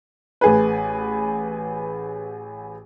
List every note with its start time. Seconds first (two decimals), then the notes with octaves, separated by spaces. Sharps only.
0.41 A1 G#4 B4